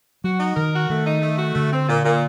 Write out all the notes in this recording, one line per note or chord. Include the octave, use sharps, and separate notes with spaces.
F#3 F#4
D#4
D#3 A#4
F#4
D#3 A3
D#4
A3
F#4
D3 A3
C4
A#2
A#2